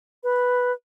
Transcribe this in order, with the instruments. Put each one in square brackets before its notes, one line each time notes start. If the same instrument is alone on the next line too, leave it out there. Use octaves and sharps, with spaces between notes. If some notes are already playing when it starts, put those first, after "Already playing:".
[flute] B4